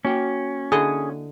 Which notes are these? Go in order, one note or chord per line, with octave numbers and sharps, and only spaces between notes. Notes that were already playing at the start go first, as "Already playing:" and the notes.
A#3 C#4 F#4 G5
D3 E4 G#4 D#5